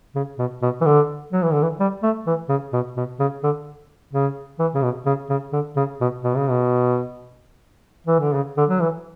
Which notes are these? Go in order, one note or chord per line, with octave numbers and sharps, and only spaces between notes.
C#3
B2
B2
E3
D3
F#3
E3
D3
E3
G3
A3
E3
C#3
B2
B2
C#3
D3
C#3
E3
C#3
B2
C#3
C#3
D3
C#3
B2
B2
C#3
B2
E3
D3
C#3
D3
F#3
E3